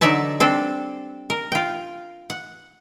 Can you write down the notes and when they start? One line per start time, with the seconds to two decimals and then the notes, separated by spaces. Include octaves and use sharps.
0.01 D3 F#3 D#4 D5 E5 A5
0.40 G3 C4 D4 A4
1.30 A#4
1.52 F4 G5
2.30 F#5